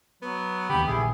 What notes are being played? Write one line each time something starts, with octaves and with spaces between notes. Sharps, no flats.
F#3 B3
D#2 D3 G4 B5
A#1 D3 D#3 E4 G#4